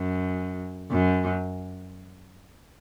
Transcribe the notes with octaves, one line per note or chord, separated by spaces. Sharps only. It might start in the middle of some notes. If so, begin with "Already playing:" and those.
Already playing: F#2
F#2